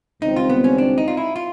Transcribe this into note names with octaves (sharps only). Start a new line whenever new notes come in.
C#2 C3 D#3 G3 C4 D#4
F4
B3
C#4
D4
D#4
F4
E4
F4